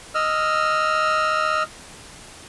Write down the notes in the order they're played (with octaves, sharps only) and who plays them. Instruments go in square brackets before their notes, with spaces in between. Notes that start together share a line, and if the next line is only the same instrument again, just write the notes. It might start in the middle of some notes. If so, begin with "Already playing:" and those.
[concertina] D#5 E6 F6